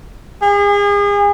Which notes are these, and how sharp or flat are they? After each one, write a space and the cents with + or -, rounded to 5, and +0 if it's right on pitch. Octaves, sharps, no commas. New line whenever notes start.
G#4 -35